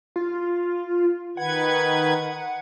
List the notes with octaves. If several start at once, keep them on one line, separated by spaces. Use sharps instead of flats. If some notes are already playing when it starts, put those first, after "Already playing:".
F4
D#3 B4 F#5 G#6